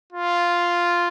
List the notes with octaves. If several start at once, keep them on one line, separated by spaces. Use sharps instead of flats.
F4